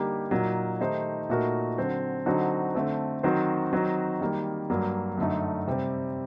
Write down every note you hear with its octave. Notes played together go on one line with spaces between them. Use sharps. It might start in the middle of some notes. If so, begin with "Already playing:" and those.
Already playing: D3 G3 A#3 D#4 G4
A#2 F#3 A#3 D#4
D#3 A3 D#4 G4 C5
A#2 A3 D#4 F#4 A#4
D3 F#3 C4
D3 F#3 C4 D#4 F#4
D3 A3 C4
D#3 F#3 C4 F#4 C5
D#3 F#3 C4 D#4 F#4
D#3 G3 A#3
G2 F#3 A#3
F#2 D3 A3 D#4
C3 G3 C4